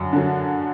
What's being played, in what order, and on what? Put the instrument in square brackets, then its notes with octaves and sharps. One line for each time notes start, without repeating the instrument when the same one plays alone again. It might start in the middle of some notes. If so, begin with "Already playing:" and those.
Already playing: [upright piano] F#2 D3
D3 F#3